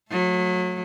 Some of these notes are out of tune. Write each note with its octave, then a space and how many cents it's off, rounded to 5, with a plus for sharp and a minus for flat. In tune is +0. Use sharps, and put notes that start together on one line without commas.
F#3 -30 A3 +0